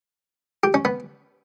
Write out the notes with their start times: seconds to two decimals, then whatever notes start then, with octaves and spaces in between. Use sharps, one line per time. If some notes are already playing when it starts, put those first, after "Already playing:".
0.63 G4
0.74 C#4
0.85 B3